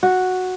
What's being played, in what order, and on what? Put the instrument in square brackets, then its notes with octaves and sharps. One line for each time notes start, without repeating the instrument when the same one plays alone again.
[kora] F#4